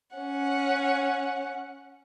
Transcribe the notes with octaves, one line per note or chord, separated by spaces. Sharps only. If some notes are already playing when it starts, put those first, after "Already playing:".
C#4 F#5